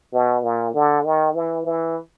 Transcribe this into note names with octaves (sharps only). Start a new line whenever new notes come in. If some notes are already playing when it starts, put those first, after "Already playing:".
B2
A#2
D3
D#3
E3
E3